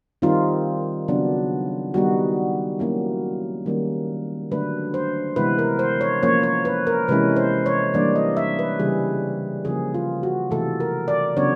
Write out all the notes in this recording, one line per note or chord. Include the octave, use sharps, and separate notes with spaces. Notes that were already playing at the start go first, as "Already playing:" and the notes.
D#3 G3 C4 D#4 F4
C#3 F#3 B3 D4
D#3 G3 B3 D#4 F#4
F#3 A#3 C#4 E4
D#3 G3 A#3 C#4
D3 F#3 A3 D4 B4
C5
C3 E3 G#3 B3 E4 B4
A#4
C5
C#5
F3 A#3 C#4 C#5
C#5
B4
A#4
C3 E3 G#3 C#4 E4 B4
C5
C#5
E3 G3 A#3 D4 D5
D#5
E5
B4
C#3 E3 G3 G#4
C#3 F3 A#3 G#4
F4
F#4
C3 E3 A3 A4
A#4
D5
C#3 F#3 B3 D4 C#5